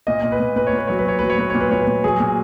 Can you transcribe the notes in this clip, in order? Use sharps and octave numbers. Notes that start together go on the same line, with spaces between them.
A#2 D#5
A#2
B4
A#2
A#2 B4
C#5
A#2 B4
F#3 C#5
B4
A#2 C#5
F#3 B4
C#5
A#2 B4
A#2 C#5
B4
A#2 C#5
B4
A#2
F#3 G#4
A#2